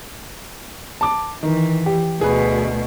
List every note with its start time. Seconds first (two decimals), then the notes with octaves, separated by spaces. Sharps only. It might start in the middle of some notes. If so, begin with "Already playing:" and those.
1.01 A5 D6
1.43 D#3 E3
1.86 G4
2.21 D2 B2 G#4 B4